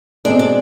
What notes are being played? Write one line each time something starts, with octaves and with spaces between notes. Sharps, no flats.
B2 G#3 C4 D4
D4